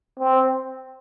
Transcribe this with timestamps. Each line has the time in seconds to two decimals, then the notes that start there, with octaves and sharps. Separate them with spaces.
0.19 C4